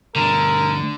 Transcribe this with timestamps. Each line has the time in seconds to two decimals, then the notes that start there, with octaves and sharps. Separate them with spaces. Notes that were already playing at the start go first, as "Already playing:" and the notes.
0.16 D2 G2 D3 A#4